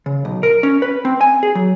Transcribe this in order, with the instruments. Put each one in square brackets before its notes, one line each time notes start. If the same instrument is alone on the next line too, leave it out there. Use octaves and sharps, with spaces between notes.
[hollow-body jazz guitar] C#3
B1
A#4
C#4
B4
C4
G#5
G#4
F#3